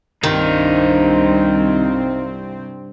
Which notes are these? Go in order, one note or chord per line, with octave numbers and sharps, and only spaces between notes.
C2 G2 D#3 C4 D#4 F4